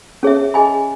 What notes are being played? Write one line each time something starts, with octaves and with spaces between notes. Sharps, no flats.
C#4 G#4 C#5 E5
G#4 D#5 G#5 B5